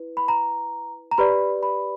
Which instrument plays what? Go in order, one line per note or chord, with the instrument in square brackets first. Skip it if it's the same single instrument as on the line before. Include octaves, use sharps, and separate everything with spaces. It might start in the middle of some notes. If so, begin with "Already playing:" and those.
Already playing: [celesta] E4 B4
B5
A#5
A#5
G4 B4 D5 B5
B5